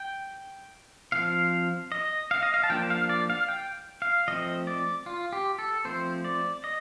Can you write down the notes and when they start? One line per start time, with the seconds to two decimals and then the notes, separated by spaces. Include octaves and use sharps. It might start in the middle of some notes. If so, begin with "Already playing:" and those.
Already playing: G5
1.12 F3 C4 F5
1.92 D#5
2.31 F5
2.43 D#5
2.54 F5
2.64 A5
2.70 F3 A#3 D4 G5
2.90 F5
3.09 D5
3.30 F5
3.49 G5
4.02 F5
4.28 F3 A3 C4 D#5
4.67 D5
5.06 F4
5.33 G4
5.59 A4
5.85 F3 A3 C4 C5
6.25 D5
6.64 D#5